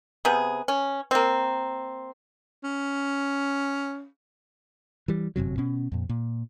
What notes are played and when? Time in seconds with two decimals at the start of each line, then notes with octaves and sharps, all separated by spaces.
0.25 C3 B3 G#4
0.68 C#4
1.11 A#3 C4
2.64 C#4
5.08 E3 G3
5.36 G1 F#2 C3 F#3
5.58 B2 C#4
5.92 F2 A#2
6.09 A#2